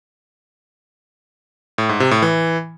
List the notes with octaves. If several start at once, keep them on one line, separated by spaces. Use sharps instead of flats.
A2
G#2
C3
A2
E3